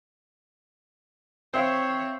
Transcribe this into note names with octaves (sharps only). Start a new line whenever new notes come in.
C4 C5 C#5 E5 F5